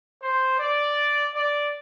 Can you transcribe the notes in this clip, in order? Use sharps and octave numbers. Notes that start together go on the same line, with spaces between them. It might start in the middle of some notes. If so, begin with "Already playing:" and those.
C5
D5
D5